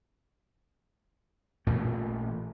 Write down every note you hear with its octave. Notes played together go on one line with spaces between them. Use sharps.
A1 A#2 E3 A3